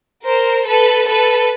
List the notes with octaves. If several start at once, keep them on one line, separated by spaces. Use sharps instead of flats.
A#4 C5
A4 B4
A4 B4